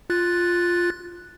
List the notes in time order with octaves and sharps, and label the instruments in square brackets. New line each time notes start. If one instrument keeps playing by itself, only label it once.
[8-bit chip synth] F4 F#6 A6